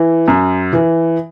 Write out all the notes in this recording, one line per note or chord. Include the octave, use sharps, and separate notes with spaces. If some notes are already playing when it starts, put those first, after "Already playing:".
Already playing: E3
F#2
E3